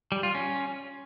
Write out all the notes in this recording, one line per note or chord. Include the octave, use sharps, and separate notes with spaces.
G3
F4
C#4